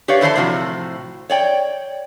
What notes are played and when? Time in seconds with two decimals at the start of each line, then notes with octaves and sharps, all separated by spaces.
0.08 G4 B4 C#5 D5 F5
0.21 D3 E3 C5 D5 A5
0.36 A2 C3 F3 F#4
1.30 C#5 D5 G5